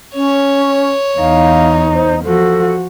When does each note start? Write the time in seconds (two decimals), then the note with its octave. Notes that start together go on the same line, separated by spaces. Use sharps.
0.15 C#4 C#5
1.18 E2 D#4 F5
1.94 C5
2.24 F3 F#4 A4